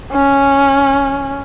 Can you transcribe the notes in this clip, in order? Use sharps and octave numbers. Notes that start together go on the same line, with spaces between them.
C#4